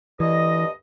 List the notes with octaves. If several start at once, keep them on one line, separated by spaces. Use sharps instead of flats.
D2 G2 E3 D#5